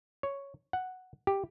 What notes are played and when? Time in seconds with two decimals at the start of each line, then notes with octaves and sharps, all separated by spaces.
0.23 C#5
0.73 F#5
1.27 G4